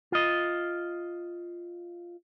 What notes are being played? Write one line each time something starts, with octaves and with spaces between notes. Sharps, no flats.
F4 D#5